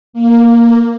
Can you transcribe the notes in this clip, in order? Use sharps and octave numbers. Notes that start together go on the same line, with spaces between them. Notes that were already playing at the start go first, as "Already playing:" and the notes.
A#3